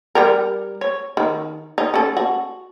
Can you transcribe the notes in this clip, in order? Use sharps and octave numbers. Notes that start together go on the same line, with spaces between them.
G3 G4 A#4
C#5
D#3
D#4
C#4 A4
F#4